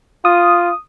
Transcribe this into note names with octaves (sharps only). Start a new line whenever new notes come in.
F4 D#6